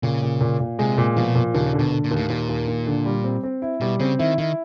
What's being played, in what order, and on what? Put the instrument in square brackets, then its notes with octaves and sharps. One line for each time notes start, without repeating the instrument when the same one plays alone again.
[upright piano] A#2 [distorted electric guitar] C#3
[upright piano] A#2
A#2
A#2
[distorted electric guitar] C3 [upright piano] G#3
[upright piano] A#2
[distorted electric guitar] B2 [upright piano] F3
[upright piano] A#2
[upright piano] D#2 [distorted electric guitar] C#3
[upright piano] D3
[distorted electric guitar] B2
[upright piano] D3
[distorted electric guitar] A#2
[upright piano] D#2
[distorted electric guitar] A2
[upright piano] D#2 [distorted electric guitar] A#2
[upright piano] D#2
D#2
D3
G3
C4
C4
E4
[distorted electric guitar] B2 [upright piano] G3
[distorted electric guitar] C#3 [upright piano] C4
[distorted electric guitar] D#3 [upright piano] E4
[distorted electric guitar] D#3 [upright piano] E4